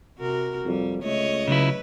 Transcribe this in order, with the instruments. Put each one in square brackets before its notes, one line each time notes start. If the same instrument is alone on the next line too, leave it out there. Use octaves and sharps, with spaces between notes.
[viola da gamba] C3 F#4 A#4
[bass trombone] F2 [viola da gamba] G3
[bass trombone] C#2 [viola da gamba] A3 [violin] C#5 D#5
[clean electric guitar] C#3 F#3 E4 [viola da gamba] B4